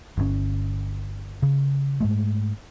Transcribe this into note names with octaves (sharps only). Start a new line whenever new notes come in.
G1 C#3 C#4
C#3
G#2 G#3 A3